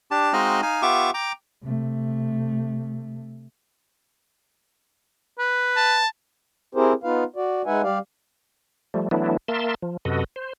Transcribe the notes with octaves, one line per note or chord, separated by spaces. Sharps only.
D4 G4 A5
G#3 C4 D#4 F#4 D#5 F5
D#4 F5 G#5
B3 F4 G4 E5 C#6 D6
G5 A#5 D6
C3 A3
B4
A5
C4 E4 G4 G#4 A#4 C5
B3 D#4 F4 B4 F5
F#4 D5
G#3 D#4 B4 E5 F#5 G#5
G3 G4 D5 F5
F3 G3 A3
E3 F#3 A3 B3 D4 E4
A#3 A#4 E5 A5 C6
F3
F#2 C3 F#4 A4 B4 D#5
C5